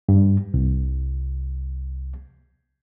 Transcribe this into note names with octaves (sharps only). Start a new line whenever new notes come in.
G2
C2